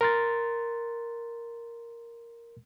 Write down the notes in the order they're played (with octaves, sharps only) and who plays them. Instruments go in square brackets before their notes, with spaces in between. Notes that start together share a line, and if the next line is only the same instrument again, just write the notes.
[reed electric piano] A#4 C6 A6